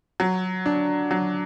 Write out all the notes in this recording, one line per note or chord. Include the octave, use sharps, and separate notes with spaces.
F#3
D4
F#3